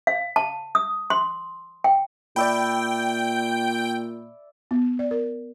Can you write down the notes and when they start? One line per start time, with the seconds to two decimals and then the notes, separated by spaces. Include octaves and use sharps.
0.07 F5
0.36 A5
0.75 D#6
1.10 C6
1.84 G5
2.36 A#2 D5 E5 G5 B5
4.71 B3
4.99 D5
5.11 A#4